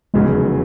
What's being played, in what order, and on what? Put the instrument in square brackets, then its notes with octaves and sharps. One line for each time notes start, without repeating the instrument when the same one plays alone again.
[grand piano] F1 E2 C#3 F#3 [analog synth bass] G#3